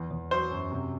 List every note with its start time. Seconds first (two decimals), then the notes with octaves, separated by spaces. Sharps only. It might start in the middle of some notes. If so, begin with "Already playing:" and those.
Already playing: E2
0.11 E2
0.31 F#3 C5
0.51 F#2
0.72 C3